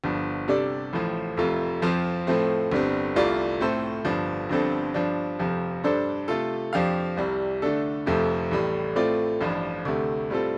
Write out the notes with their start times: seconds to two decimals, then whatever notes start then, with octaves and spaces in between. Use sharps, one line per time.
0.04 G1 G2 F3
0.48 C3 G3 D4 A4 D5
0.93 A1 A2 F3
1.37 F1 F2 C3 A3 F4
1.82 F2 F3 C4 F4 C5
2.27 A2 F3 A3 C4
2.72 G1 G2 G3 C4
3.16 C2 C3 A3 F4 D5
3.61 A2 A3 C4 A4 C5
4.05 G1 G2 F3 D4
4.49 G1 G2 F3 C4 A4
4.94 G2 F3 D4
5.39 F1 F2 C3 F3
5.84 G2 G3 D4 A4 C5
6.28 C3 A3 F4 A4
6.73 F2 F3 D4 G4 F5
7.17 C2 C3 G3
7.62 D3 A3 D4 A4
8.06 F1 F2 C3 F3 A3
8.51 A1 A2 G3
8.96 A2 A3 C4 F4 D5
9.41 A1 G2 F3 D4
9.85 D2 C3 A3
10.30 A2 G3 C4 F4 A4